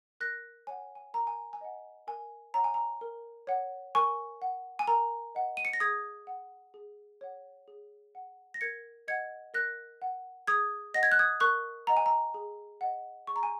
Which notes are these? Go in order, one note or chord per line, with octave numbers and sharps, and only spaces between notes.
A#4 F#6 A#6
C#5 F#5 G#5
G#5
A#4 A#5
G#5
G#5
D#5 F#5
A#4 G#5
C#5 F#5 A#5
G#5
A#5
A#4
C#5 F#5
A#4 G#5 C#6
F#5
G#5
A#4 A#5
D#5 F#5
D#7
C#7
A#6
G#4 D#6 G#6
F#5
G#4
C#5 F#5
G#4
F#5
A#6
A#4 G#6 C#7
D#5 F#5 G#6 C#7
A#4 F#6 A#6
F#5
G#4 D#6 G#6
D#5 F#5 A#6
G#6
F#6
D#6 G#6
A#4 C#6 F#6
D#5 F#5 A#5
G#5
A#5
G#4
D#5 F#5
G#4 C#6
A#5
G#5